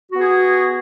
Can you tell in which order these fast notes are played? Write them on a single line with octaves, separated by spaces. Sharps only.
F#4 B3 G#4